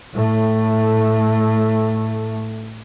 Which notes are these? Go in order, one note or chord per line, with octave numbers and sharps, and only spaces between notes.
A2 A3